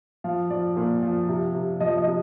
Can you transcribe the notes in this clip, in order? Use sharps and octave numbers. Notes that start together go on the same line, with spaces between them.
F3 F5
F3 D5
A#2
F3
C3
C3
F3 D#5
D#5
C3